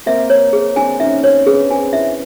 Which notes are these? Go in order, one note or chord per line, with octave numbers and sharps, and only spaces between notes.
A#3 C4 E5
C#5
G#4
C4 D4 G#5
C#4 D#4 E5
C4 D4 C#5
B3 C#4 G#4
C4 D4 G#5
D4 E4 E5